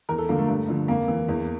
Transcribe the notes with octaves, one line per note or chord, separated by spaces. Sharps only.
E2 A#4
A4
D3 F3 A#3
A3
G2
D3 F3
F2 A#3
E3
E2